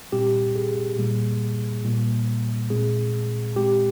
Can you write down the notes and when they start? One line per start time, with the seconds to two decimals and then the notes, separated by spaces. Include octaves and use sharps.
0.12 A#2 G3 C4 G4
0.55 G#4
0.98 A#2 G3 A#3
1.84 A#2 G3 A#3
2.70 A#2 G#3 C4 G#4
3.56 A#2 G#3 C4 G4